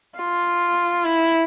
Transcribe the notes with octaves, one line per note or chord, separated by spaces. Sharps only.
F4
E4